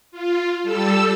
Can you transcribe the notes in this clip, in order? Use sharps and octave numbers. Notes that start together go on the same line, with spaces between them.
F4
G3 A4 E6